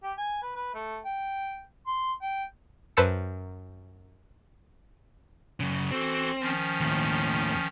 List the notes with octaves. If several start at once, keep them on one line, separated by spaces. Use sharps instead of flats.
G4
G#5
B4
B4
A3
G5
C6
G5
F#2 B4 C5 A5 E6 C#7
F#2 C#3
E3 C4 F#4 A4
D#3 F3 C#4
D#2 A2